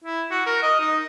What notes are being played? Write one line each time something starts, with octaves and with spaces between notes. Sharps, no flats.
E4
F#4
A#4
D#5
D#4